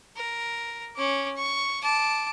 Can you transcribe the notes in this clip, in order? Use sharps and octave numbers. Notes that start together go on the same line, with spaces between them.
A#4
C#4 D6
C#6
A5 D6